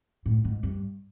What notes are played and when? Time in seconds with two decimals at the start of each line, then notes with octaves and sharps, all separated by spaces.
0.26 A2
0.45 G#2
0.63 G2